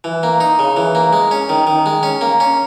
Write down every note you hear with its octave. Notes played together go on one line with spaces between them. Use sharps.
E3
A#3
D#4
C#3
E3
A#3
G#3
C#4
D#3
D#3
G#3
C#4
A#3
C#4